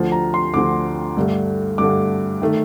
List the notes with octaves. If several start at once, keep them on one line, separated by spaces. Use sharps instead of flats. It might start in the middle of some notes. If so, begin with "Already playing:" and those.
Already playing: D2 D3 F3
A#5
C6
D2 D3 F3 D6
G2 D3 A3
G2 D3 A3 D6
D#3 A3